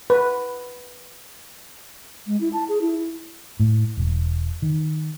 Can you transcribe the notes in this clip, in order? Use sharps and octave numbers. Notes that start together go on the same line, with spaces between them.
B4
G#3
E4
A5
G#4
E4
A2
E1
D#3